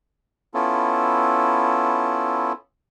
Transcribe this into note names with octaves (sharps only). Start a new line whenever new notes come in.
B3 C#4 E4 F4 A4